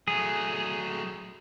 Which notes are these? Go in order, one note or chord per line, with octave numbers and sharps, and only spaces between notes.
F#3 A3 G#4